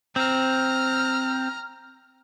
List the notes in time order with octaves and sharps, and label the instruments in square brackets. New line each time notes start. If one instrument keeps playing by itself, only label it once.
[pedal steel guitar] C4 [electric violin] A#5 F6